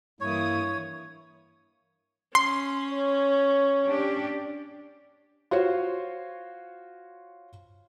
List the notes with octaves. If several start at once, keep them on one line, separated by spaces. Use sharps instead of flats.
G2 E3 A#3 E4 C#5 D#6
C#4 C6
C#5
D4 G4
F4 F#4 C5 C#5